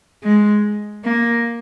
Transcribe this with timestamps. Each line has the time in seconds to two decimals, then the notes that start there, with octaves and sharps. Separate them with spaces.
0.23 G#3
1.04 A#3